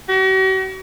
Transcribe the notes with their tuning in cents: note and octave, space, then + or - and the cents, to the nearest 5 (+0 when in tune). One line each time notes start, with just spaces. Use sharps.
F#4 +45